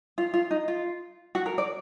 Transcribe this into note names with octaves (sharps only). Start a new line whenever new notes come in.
F4
F4
D#4
F4
F#4
A#4
D5